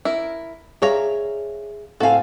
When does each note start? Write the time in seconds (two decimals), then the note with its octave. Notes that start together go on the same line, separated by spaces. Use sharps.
0.05 E4 A#4
0.82 D4 G#4 C#5 E5 F5 A#5
2.00 A2 C4 F#4 A4 F5 G#5